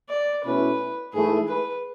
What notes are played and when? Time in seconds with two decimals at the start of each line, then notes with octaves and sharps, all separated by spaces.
0.10 D5
0.44 B2 A3 C#4 E4 B4
1.13 G#2 E3 A3 E4 G#4
1.48 B4